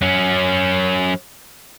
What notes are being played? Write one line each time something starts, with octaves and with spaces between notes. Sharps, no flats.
F#3 C#4